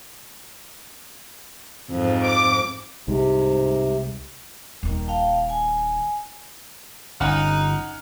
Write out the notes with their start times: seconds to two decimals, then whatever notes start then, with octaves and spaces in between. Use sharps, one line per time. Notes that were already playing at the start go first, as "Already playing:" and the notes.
1.91 F2 G#2
2.24 D6
3.08 C2 G#2 C3
4.83 D#1 D#3
5.07 F5 G5 A5
5.50 G#5
7.20 G1 C#4 D#4 F#5 F6